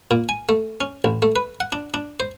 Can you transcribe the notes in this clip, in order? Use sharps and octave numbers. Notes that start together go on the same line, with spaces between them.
A#2
G#5
A3
C#4
A1
A3
B4
F#5
D4
D4
C5